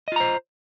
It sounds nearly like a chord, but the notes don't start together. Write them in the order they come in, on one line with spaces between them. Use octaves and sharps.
D#5 F4 A#5 C5